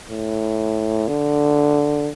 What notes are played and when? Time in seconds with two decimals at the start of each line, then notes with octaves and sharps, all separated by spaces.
0.10 A2
1.08 D3